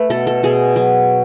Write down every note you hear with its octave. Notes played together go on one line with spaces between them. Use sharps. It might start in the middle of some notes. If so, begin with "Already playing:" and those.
Already playing: A3 B4
B2 A4
A4
B2 G#4
F#3